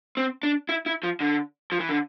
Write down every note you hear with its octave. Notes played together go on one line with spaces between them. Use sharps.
C4
D4
E4
E4
F3
D3
F3
E3
D3